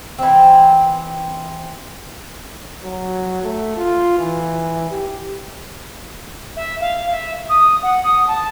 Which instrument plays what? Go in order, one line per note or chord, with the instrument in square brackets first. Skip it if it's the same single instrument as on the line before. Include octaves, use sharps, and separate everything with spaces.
[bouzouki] E3 C4
[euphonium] F#3
A3
F4
E3
G4
[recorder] E5
F5
E5
D#6
F#5
D#6
A5